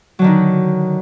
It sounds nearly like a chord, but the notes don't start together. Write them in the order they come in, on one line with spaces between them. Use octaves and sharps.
F#3 D3 D#3 D#4